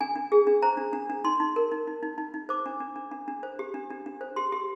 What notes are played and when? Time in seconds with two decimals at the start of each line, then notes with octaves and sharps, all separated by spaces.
0.01 D4 G#5
0.16 D4
0.32 G#4
0.47 D4
0.62 C5 A#5
0.77 D4
0.93 D4
1.10 D4
1.24 D#4 C6
1.40 D#4
1.56 A#4
1.72 D#4
1.87 D#4
2.03 D#4
2.18 D#4
2.34 D#4
2.49 C5 D6
2.66 D4
2.80 D4
2.96 D4
3.11 D4
3.28 D4
3.43 C5
3.59 G4
3.74 D4
3.90 D4
4.06 D4
4.21 C5
4.36 G4 C6
4.52 G4